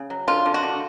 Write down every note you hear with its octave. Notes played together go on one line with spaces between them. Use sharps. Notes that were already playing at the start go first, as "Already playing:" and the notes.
Already playing: C#3
F#3
D3 F4
D3
F#4
D3